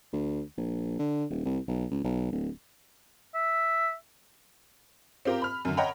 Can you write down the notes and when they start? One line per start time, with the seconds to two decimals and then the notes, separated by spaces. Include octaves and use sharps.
0.13 D2
0.57 A#1
0.99 D3
1.30 D#1
1.45 C2
1.68 B1
1.91 C#2
2.04 B1
2.32 D1
3.35 E5
5.25 C4 F4 G4 A#4
5.42 B5 F6
5.65 F#2 D3
5.77 C#5 D#5 F#5 G5 A#5 B5